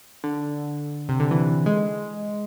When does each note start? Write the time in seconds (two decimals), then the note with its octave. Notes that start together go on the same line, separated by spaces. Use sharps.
0.24 D3
1.09 C3
1.20 D3
1.31 E3
1.66 G#3